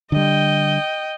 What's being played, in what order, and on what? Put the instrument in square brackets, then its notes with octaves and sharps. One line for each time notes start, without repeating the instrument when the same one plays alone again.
[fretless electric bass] D3 G3 [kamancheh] D#5 G5